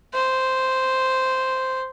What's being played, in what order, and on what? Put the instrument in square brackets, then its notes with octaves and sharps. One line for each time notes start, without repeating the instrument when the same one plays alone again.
[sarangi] C5